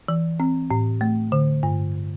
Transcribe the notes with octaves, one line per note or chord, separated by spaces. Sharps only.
E3
C4
A2
A3
D3
G2